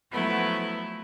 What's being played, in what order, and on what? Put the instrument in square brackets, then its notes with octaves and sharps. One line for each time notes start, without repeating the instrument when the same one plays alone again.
[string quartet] F3 F#3 A3 B3 E4